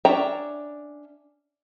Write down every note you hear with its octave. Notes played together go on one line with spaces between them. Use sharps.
C#4 D4 E5 G5 A#5